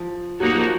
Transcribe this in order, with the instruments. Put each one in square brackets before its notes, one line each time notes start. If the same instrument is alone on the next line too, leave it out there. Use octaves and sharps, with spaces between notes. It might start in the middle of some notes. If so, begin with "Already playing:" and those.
Already playing: [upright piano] F3
[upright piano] F#3 [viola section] A#3 D#4 F#4
[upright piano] F3